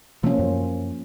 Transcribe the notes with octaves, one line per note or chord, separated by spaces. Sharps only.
C3 F3 A3 A#3 C#4
F#2